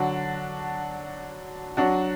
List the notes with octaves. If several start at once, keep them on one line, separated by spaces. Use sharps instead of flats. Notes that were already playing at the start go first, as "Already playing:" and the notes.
Already playing: D3 F#3 D4 F#4
F#3 D4 F#4